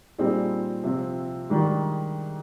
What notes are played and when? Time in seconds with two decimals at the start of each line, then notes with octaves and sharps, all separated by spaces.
0.18 A#2 G3 C4 D#4 G#4
0.84 C3 F3 C4
1.50 G#2 D#3 G3 D4